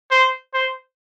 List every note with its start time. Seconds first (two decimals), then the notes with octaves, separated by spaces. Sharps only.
0.11 C5
0.54 C5